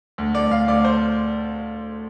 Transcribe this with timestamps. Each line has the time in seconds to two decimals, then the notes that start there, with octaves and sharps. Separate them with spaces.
0.18 D2
0.34 D2 D5
0.51 D2 F5
0.68 D2 D5
0.84 C5